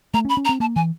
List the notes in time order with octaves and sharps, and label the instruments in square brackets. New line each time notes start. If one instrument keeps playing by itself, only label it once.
[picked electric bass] A3 [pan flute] A#5
[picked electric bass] C#4
[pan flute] B5
[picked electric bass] C#4
[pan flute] A#5
[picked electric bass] C4
[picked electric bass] A#3 [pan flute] A5
[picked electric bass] E3 [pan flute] G#5